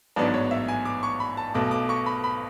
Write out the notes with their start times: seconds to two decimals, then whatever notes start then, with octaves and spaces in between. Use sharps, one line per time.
0.16 A1 G#2 F#3 B3 D4 D5
0.34 C#5
0.51 E5
0.68 G#5
0.85 D6
1.03 C#6
1.20 B5
1.37 A5
1.55 B1 B2 A3 D6
1.71 D6
1.89 C#6
2.06 B5
2.24 B5